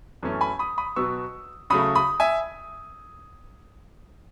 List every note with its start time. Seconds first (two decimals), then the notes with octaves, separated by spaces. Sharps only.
0.23 F#2 E3 A3 C#4
0.41 G#5 B5
0.59 B5 D#6
0.78 B5 D#6
0.96 B2 F#3 B3 C#6 E6
1.70 C#3 F#3 A3 B5 D#6
1.95 B5 D#6
2.20 E5 G#5